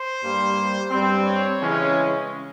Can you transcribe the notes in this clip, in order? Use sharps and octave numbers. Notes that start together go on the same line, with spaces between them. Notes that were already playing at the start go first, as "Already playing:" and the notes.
Already playing: C5
G2 G3 A#3
G2 G3 C4
C#5
C#3 E3 G#3 C#4